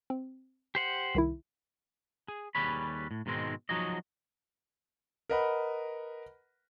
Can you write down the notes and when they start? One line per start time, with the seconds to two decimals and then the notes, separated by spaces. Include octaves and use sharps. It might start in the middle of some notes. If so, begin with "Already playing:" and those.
0.10 C4
0.75 G4 C5 F#5
1.15 C2 D#3 E4
2.28 G#4
2.55 D#2 G3 G#4 B4 C#5 B5
3.11 A2
3.26 G#2 B2 D#3 G#3 C4
3.69 F3 F#3 D#4 F#4 G#4 D#5
5.30 A#4 B4 D#5 F#5 B5